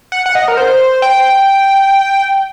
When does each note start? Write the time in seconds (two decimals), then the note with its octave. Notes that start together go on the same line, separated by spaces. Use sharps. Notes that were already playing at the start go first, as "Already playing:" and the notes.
0.12 F#5
0.26 F#5
0.35 D#5
0.48 A#4
0.57 C5
1.02 G5